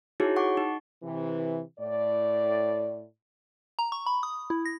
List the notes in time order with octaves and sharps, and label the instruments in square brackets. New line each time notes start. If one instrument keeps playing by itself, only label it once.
[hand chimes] D#4 E4 F#4 G#4 C#5
F#5 C#6 D6
D#4
[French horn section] C3 E3
A2 D5
[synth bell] A#5
C#6
B5
D#6
E4
A#6